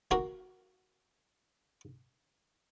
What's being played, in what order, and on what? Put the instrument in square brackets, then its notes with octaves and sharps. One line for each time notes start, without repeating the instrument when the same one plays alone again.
[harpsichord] A#3 F#4 A#4